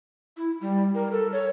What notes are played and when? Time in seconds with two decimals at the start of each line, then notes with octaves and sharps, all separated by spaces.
0.37 E4
0.61 G3
0.95 A#4
1.12 A4
1.32 C#5